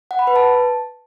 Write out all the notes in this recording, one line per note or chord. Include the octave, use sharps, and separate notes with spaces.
F#5
B5
B4
A5